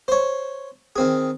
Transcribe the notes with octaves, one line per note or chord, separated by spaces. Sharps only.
C5 C#5
D#3 C4 G#4